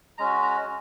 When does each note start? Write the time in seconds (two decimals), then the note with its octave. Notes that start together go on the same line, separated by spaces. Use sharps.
0.18 G#3 C#4 F#4 A#5
0.43 A#5